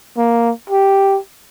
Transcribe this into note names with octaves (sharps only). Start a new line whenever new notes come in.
A#3
G4